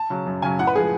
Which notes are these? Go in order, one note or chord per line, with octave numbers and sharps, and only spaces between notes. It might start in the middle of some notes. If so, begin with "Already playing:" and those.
Already playing: A5
C#3 F#3
F#2
C#3 F#3 G#5
A2 F#5
B4
F3 G#3 G#4